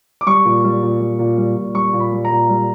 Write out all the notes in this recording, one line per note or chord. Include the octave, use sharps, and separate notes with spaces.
D6
G3 C#6
A#2
G3
A#2
G3
A#2
G3
A#2
G3 C#6
A#2
B5
G3
A#5
A#2
G3